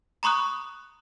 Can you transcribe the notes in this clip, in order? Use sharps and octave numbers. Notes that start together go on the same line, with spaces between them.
A#5 B5 C#6 D#6 F#6